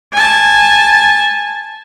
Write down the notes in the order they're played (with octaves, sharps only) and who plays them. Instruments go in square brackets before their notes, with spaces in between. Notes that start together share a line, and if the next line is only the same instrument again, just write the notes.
[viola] G#5 A5